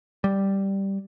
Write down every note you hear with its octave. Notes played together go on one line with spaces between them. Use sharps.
G3